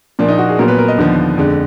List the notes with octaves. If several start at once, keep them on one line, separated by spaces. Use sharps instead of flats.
A#2 F3 A#3 D4
D#4
F#4
G#4
A#2 F#3 B3 A#4
B4
A#4
D#5
D#2 D3 F3 B3
F2 D3 G#3